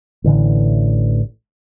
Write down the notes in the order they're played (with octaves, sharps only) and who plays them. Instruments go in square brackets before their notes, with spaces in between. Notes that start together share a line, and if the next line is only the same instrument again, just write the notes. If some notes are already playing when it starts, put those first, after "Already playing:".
[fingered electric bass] A1 D3 E3